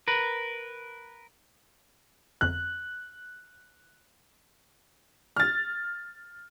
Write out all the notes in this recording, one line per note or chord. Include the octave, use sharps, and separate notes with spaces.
A#4 B4
G1 F2 F#6
F6 A6